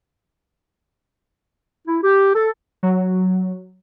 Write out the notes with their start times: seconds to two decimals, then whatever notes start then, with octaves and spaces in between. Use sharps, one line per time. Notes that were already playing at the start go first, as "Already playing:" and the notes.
1.86 E4
2.03 G4
2.34 A4
2.83 F#3